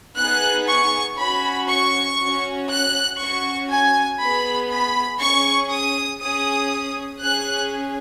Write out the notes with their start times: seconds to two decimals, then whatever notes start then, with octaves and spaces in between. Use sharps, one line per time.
0.17 B3 D#4 G#4 F#6
0.68 C#6
1.18 C#4 F#4 B5
1.69 C#6
2.19 C#4 F#4
2.70 F#6
3.19 C#4 F#4 C#6
3.70 G#5
4.21 B3 G#4 B5
4.70 B5
5.21 C#4 G#4 C#6
5.72 D#6
6.21 C#4 G#4 D#6
7.22 C#4 G#4 F#6